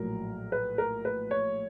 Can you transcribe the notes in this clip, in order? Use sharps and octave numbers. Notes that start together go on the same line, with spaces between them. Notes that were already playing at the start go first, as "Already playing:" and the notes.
Already playing: A#1 A2 F#3 A#4
B4
A#4
B4
C#5